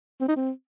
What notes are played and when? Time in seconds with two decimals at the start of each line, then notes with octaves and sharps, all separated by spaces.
0.21 C4
0.28 D#4
0.36 C4